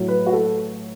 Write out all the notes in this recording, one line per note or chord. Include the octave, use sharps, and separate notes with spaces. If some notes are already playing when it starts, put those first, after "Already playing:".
Already playing: A2 F#3
B4
F#4
A4